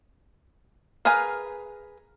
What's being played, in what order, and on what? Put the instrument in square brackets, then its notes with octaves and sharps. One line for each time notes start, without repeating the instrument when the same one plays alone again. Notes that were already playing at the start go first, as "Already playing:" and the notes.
[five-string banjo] G#4 A#4 B4 F5 G#5